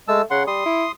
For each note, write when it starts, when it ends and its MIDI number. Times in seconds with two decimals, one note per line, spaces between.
0.08 0.22 56
0.08 0.23 57
0.08 0.22 81
0.08 0.22 88
0.31 0.45 49
0.31 0.43 78
0.31 0.43 84
0.47 0.65 55
0.47 0.92 84
0.47 0.92 87
0.66 0.86 64